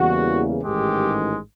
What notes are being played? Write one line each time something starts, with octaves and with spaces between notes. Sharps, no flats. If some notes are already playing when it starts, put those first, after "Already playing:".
Already playing: E2 C#3 E3 G3 A#3 F#4
A1 G#2 D#3 G#3 G4